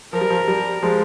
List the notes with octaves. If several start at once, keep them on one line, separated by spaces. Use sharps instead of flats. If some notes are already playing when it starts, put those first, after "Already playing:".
F3 A#4
G3
F3
G3
F3 G#3